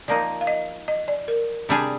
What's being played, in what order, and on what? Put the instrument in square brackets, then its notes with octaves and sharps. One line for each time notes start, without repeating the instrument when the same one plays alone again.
[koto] F3 A#3 D#4 [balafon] D5
[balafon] F5
D#5
D#5
D5
A#4
[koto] C3 G3 D4 G#4